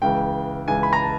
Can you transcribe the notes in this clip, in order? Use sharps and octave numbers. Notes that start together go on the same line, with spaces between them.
C#2 C#3 E3 G5
C#2 C#3 E3 G#5
B5
A#5
A5